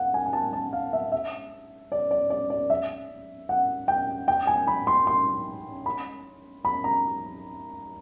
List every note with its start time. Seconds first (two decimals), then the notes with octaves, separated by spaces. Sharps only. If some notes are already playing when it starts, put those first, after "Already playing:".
Already playing: F5 F#5
0.14 G#5
0.26 G#5
0.33 A5
0.53 A5
0.73 F5
0.93 E5
1.12 E5
1.92 D5
2.11 D5
2.30 D5
2.50 D5
2.70 E5
3.49 F#5
3.88 G5
4.28 G5
4.47 G#5
4.67 B5
4.87 C6
5.07 C6
5.86 B5
6.65 B5
6.84 A#5